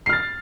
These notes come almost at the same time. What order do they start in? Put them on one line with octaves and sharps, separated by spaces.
C7 F6 A6